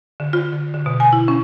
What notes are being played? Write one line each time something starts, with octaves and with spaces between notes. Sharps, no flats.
D3
F4
D3
D3
B2
G#5
E4
C#4